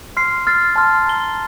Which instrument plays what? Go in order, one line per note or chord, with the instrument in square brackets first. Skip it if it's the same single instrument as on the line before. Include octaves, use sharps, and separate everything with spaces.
[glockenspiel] C6 F6 C7
F6 A6 C7
A5 C6 F6
A#5 F6 C7 G7